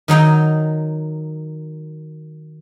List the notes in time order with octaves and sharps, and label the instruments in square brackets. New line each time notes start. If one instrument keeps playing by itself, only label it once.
[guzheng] D#3 F#3 D#4 G5